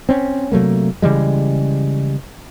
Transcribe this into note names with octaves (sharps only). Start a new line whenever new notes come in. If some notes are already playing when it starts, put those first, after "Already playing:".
C4 C#4
C3 F#3 A3 A#3
C#3 E3 G3 G#3